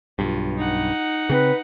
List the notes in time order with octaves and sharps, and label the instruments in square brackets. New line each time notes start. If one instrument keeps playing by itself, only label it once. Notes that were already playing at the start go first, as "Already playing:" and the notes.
[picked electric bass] B1 G2 [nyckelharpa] F4
[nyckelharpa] D#4 F#5
[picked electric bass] C#3 C4 [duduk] B4